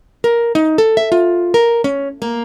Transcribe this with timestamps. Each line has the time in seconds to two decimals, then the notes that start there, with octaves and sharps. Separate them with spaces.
0.24 A#4
0.55 D#4
0.78 A4
0.97 E5
1.12 F4
1.54 A#4
1.84 C#4
2.22 A#3